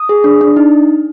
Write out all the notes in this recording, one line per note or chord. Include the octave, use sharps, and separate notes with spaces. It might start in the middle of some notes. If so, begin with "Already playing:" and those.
Already playing: D#6
G#4
D4
D4
D#4